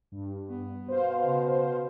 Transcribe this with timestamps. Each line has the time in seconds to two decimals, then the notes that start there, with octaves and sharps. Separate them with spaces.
0.12 G2
0.48 B3
0.88 B2 C5 F5
1.23 C#3